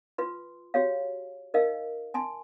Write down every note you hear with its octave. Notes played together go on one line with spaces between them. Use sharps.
F4 B4 C6
F#4 G4 C#5 F5
D#4 A#4 D#5 F5
G#5 A5 C6